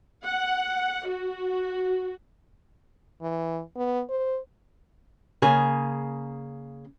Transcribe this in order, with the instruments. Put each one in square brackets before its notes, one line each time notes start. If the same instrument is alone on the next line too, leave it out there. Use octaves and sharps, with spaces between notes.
[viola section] F#5
F#4
[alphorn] E3
B3
C5
[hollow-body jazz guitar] C#3 A#3 G#4